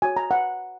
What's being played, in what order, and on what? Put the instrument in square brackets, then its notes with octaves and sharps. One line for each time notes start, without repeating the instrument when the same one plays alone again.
[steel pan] F#4 C#5 G#5
A#5
F#5